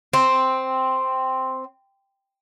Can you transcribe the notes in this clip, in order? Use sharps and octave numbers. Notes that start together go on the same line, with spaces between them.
C4